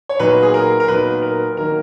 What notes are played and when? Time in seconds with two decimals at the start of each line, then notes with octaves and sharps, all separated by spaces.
0.09 C#5
0.19 A#2 F#3 B3 D#4 B4
0.43 G#4
0.54 A#4
0.80 A#4
0.88 A#2 F#3 B3 D#4 B4
1.16 B4
1.22 A#4
1.57 D#3 F#3 A#3 D#4 A#4